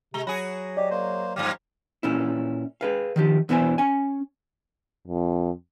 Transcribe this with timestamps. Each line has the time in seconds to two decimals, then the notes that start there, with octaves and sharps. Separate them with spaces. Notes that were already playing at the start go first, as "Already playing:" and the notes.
0.14 C3 G#3 A#5 G7
0.27 F#3 F#4 G#4 B5
0.77 G4 D5 D#5
0.91 A#3 C5
1.36 G2 F3 A#3 G4 F5
2.03 A#2 C#4 E4
2.81 G#4 B4 F5
3.16 D#3 F3 G4
3.49 E2 B2 E3 E4 C5 G#5
3.78 C#4 G#5
5.08 F2